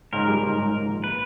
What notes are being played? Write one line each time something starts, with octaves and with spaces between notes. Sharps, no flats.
G#2 A#4
G3
G#2
G#2
G#2
A#1
B4